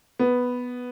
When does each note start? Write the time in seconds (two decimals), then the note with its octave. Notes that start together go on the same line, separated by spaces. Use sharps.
0.19 B3